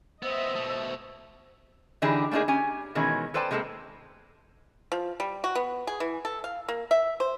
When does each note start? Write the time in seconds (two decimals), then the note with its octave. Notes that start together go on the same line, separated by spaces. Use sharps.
0.23 B3 C4 C5 D#5 E5
0.55 B2 A3
2.02 D3 E3 D4 D#4 G4 G#4
2.31 A3 A#3 D4 D#4 G#4
2.48 C#4 G4 G#5
2.95 B2 D#3 E3 G#3 C#4
3.34 A4 B4 C5 D5 G5 A5
3.51 C3 G#3 A#3 C4 A4
4.92 F3
5.20 G3
5.44 F#4
5.55 B3
5.87 G#4
6.00 E3
6.25 A4
6.44 F5
6.68 A#3
6.91 E5
7.20 C5